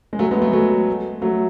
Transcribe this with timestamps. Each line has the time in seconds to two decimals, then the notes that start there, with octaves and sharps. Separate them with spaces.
0.13 G#3
0.19 F#3 A3
0.31 G#3 B3
0.42 F#3 A3
0.53 F#3 A3
1.22 F#3 A3